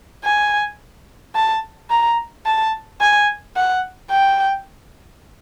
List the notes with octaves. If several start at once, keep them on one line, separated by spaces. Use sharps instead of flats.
G#5
A5
A#5
A5
G#5
F#5
G5